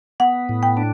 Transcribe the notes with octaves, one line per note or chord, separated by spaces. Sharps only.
B3 F#5
A2
G5
D4